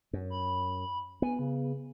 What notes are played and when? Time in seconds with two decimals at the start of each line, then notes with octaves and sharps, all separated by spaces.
0.13 F#2
0.30 B5
1.22 B3 G#5
1.39 C#3